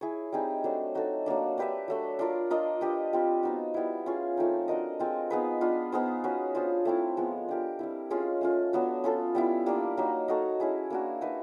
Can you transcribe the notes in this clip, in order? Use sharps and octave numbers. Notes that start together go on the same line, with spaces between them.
E4 G#4 C#5
G3 C4 D#4 G#4
F#3 A3 D4
D#4 F#4 A4
F#3 A#3 D4
D4 G4 B4 E5
F#3 A3 D4
D4 F4 A#4
D4 F4 A#4 D#5
D4 G4 B4 D#5
G3 C4 F4
B3 D#4 F#4
G3 B3 E4
C#4 F4 G#4 C#5
F3 A3 C4 D#4
D4 F#4 A#4 D#5
G#3 C4 F4
B3 D#4 G#4 B4
B3 D4 F4
B3 D#4 G#4 C5
C#4 F#4 B4
D4 F4 G#4 C5
A3 C4 E4
F3 G#3 B3
D4 G4 A#4
G3 C4 E4
G#3 C#4 F4 G#4
A3 C#4 F4
F#3 B3 D4 F#4
C#4 F4 A4
G3 B3 E4
G3 A#3 D4
F#3 A#3 D#4
D#4 F#4 A4 C#5
C#4 E4 G#4
A#3 D4 F#4
D#4 F#4 B4 E5